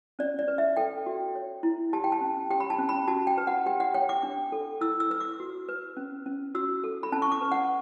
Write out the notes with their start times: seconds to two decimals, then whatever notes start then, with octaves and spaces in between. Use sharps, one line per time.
0.19 C#4 D5
0.39 D5
0.48 B4
0.58 E5
0.77 A4 G5
1.06 F#4
1.35 C#5
1.63 E4
1.93 G4 A5
2.04 G5
2.12 A5
2.21 C#4
2.50 G4 G5
2.60 B5
2.70 A5
2.79 C#4
2.89 B5
3.08 F#4 A5
3.27 G5
3.38 B4
3.47 F#5
3.66 G4 G5
3.80 F#5
3.94 C#5 G5
4.09 D6
4.23 D4
4.52 A4
4.81 E4 E6
5.00 E6
5.11 B4 E6
5.20 D6
5.40 F#4
5.68 B4
5.97 C#4
6.26 C#4
6.55 F#4 E6
6.84 A4
7.03 B5
7.12 C#4 A5
7.22 C#6
7.32 D6
7.41 B4
7.52 F#5